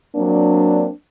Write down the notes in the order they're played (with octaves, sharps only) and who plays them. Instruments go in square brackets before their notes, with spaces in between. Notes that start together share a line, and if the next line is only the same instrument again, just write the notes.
[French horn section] F#3 A#3 C4 D4